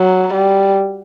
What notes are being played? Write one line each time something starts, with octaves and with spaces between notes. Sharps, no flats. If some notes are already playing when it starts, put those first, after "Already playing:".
Already playing: F#3
G3